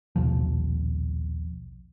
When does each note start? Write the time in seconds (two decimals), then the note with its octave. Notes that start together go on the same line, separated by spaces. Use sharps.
0.16 A#1 D#2 B2 F3